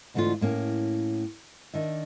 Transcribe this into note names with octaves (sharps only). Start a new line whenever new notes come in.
G#2 D3 E3 A3 D4 F4
A2 A#3 C#4
D#3 D4 E5